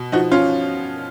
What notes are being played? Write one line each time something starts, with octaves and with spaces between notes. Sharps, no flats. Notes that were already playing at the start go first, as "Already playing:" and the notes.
Already playing: B2
F3 D#4 F#4
C#4 F4